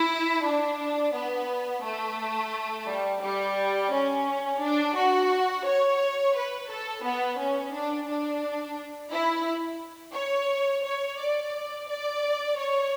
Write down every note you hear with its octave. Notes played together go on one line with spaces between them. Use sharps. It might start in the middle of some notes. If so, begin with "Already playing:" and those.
Already playing: E4
D4
B3
A3
G3
G3
C#4
D4
F#4
C#5
B4
A4
B3
C#4
D4
D4
E4
C#5
C#5
D5
D5
C#5